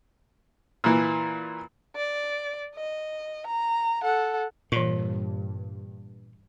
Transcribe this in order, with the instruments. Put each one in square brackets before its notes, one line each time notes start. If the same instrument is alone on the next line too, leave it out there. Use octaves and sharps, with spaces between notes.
[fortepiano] A#2 E3
[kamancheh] D5
D#5
A#5
A4 F#5
[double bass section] G2 [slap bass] A#2 [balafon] E3 C#6